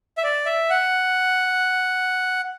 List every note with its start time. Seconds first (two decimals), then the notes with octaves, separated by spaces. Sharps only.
0.18 E5
0.23 D5
0.46 E5
0.70 F#5